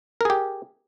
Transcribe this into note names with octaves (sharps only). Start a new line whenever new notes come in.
G4 G#4 A#4